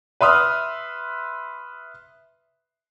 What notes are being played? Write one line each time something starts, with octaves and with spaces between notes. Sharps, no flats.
B4 E5 C6 D#6 F6